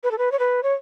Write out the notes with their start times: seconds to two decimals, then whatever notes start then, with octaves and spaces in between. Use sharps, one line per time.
0.04 B4
0.11 A4
0.18 B4
0.32 C#5
0.39 B4
0.63 C#5